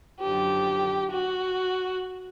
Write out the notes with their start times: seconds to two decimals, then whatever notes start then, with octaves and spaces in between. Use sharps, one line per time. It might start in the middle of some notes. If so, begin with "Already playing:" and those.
0.21 F#2 D3 F3 G4
1.11 F#4